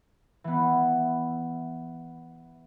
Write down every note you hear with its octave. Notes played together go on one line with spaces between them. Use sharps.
E3 B3